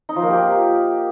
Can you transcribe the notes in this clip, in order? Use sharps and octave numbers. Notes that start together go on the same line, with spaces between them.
D#4
F3
A#3
G4